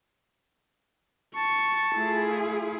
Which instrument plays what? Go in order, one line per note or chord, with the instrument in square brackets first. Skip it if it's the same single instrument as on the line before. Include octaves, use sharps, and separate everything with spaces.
[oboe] A5 [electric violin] C#6
[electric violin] A3 [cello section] E4 F4 G#4